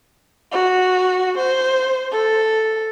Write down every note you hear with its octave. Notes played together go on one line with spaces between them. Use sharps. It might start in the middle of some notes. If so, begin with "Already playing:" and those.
F#4
C5
A4